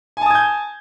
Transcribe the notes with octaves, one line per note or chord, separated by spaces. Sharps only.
G#5 A5 D#6 G6 G#6